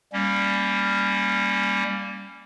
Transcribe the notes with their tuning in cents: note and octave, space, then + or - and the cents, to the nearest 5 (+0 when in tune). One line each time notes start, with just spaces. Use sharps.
G3 +15 A#3 +0 C#4 +0